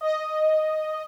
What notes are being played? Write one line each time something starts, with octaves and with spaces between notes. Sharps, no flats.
D#5